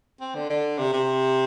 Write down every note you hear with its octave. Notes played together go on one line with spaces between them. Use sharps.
C4
D3
D3
C3
C3